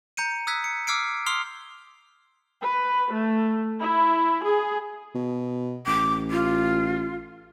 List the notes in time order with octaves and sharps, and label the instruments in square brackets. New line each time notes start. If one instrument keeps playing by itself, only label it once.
[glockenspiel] A#5 G6 C#7 D#7
D#6 E6 F#6 G#6 B6
C#7
D6 E6 F6 G#6 C7 D7
C6 D#6 F6 C7 F7 G7
[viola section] B4
A3
E4
G#4
[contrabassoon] B2
[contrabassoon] A1 [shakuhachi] D6
[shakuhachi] F4